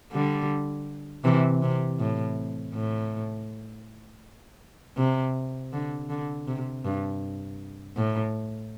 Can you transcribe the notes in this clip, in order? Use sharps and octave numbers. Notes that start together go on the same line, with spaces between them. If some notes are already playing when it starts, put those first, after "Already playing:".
D3 G3
C3 E3
C3
A2
A2
C3
D3
D3
C3
G2
A2